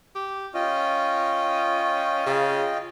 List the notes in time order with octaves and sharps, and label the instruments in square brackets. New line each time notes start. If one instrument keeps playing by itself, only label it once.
[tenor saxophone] G4
[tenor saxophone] C#4 [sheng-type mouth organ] F4 D#5 G5
[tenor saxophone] C#3